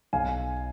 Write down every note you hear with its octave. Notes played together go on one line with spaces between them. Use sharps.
B1 F5 G#5